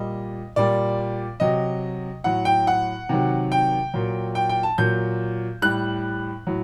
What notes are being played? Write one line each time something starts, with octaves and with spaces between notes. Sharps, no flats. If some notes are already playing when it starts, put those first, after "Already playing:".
Already playing: A#2 G3 D#5
A#2 G3 D5
C3 F#3 D#5
A2 F#3 F#5
G5
F#5
C3 D#3 F#3
G5
A#2 F#3
G5
G5
A5
A#2 F#3 G6
A2 G3 F#6
A2 F#3